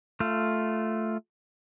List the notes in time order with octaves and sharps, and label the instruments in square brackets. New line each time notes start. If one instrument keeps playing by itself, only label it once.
[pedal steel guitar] A3 F4